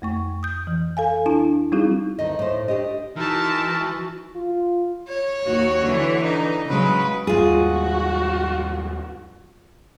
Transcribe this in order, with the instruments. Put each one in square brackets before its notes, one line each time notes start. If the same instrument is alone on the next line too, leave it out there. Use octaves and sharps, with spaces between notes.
[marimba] F2 A3 C#6
D#6 G6
E3
A4 F5 G#5
D4 E4 A5
G3 C4 D#4 E4 F#4 G#4
[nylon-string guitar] D2 D#3 D#5
A2 C5
D4 G4 D#5
[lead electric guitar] E3 [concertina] G#3 A#4 E5 [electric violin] D#4 A5 [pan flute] F#4
[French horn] F4
[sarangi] C#5
[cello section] D#2 F#4
D3 E3
[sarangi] D#4
[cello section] C#3 F#3 G#3 [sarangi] B4
[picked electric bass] D#2 G#2 G3 [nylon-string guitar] F4 G#4 [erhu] F#4